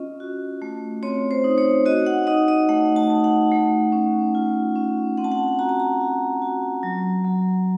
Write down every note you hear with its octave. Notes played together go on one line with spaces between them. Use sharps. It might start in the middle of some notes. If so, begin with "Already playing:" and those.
Already playing: C#4 F4 D#5
F#4
A3
C4 C#5
C5
D#4
C#5
F#4 D#5
F#5
D#4 D#5
D#5
A3 F#5
A5
D#4
F#5
A3
C#4
F4
C#4
C4 F#5
A5
F#5
F#4 A#5
A5
A#5
F#4
F#4
F#3
F#3